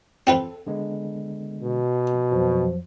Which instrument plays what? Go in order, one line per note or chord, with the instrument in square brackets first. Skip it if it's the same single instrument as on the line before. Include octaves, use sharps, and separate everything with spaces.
[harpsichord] C4 F4 B4 [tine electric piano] A4
[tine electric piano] D3 G#3 B3
[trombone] B2
[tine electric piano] F2 F3 F#3